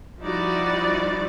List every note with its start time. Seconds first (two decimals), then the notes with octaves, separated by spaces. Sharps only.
0.21 F3 G3 D#4 E4 F#4 D5